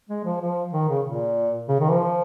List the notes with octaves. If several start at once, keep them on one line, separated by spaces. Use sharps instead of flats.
G#3
F3
F3
D#3
C#3
A#2
C#3
D#3
F3